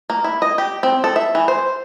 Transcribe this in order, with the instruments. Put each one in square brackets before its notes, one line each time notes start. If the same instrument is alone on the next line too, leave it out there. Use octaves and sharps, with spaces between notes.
[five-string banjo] A#3
E4
D#5
G4
C4
A4
E5
E3
C5